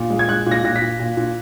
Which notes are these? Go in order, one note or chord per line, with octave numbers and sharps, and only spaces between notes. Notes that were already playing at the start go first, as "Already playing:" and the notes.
Already playing: A#2
G#3
G#6
G#3 F#6
A#2
A#6
A#2 A#6
B6
A#2
A#2
A#2